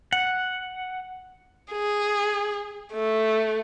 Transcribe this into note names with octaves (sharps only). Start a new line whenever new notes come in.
F#5
G#4
A3